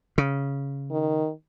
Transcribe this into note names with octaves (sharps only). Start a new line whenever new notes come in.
C#3
D#3